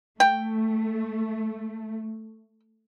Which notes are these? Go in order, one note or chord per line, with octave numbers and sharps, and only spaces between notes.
A3 G5